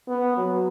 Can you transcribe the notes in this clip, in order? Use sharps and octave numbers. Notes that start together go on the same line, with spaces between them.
B3
F#3